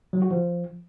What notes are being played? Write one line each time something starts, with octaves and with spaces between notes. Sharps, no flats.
F#3
F#4
F3